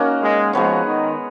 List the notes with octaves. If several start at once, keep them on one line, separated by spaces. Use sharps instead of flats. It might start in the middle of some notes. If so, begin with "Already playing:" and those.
Already playing: A#3 C#4 D#4 F#4 A#4
G#3
F3 G#3 B3 F#4 C#5
D#3